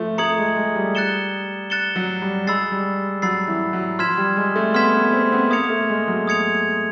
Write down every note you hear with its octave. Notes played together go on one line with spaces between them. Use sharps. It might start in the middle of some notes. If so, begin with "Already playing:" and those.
Already playing: F3 A3
A3 A#5 D#6 G#6 C#7 F#7
G#3
G#3
G3
F#6 A6 C#7 E7 G7
F#6 A6 C#7 E7 G7
F#3
G3
G#3 B5 E6 A6 C7
G3
F#3 B5 E6 A6 C7
E3
F#3
F3 C6 F6 G#6 B6 E7
G3
G#3
A3
B3 C6 F6 G#6 B6 E7
B3
C4
B3
A#3 D#6 G#6 C#7 F7
A3
G#3
F#3
D#6 G#6 C#7 F7